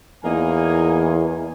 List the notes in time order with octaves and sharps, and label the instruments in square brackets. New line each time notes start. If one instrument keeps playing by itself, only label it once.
[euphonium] E2 [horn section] A#3 D#4 G#5